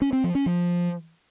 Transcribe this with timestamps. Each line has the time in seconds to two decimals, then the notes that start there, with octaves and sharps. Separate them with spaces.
0.02 C#4
0.13 C4
0.24 F3
0.35 C#4
0.46 F3